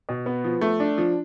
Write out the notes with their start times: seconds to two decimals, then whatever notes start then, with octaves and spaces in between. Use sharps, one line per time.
0.09 B2
0.26 B3
0.44 F3
0.61 A3
0.80 D4
0.98 F3